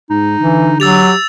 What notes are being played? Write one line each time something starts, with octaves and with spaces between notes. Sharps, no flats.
G#2 D#4
D3 E3
F#3 G4 E6 A6 F7